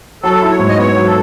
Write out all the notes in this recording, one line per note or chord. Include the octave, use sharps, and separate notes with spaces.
F#3 A4
E4
C#5
G#2
D#5
B3 C#5
F#3
A4